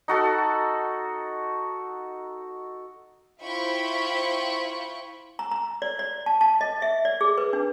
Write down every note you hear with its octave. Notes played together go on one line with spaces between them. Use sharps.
D#4 F#4 A4
E4 F4 C5 G5 B5 C#6
A#5
A#5
D5
D5
A5
A5
D#5
E5
D5
G#4
B4
D4